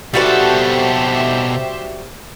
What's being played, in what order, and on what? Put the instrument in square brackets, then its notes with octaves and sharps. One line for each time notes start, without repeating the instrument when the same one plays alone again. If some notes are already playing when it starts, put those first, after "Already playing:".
[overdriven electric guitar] B2 A4 [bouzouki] G3 F#4 B4 [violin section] G4 C5 E5